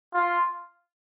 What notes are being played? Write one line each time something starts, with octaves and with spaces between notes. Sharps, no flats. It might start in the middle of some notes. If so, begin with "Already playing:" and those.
F4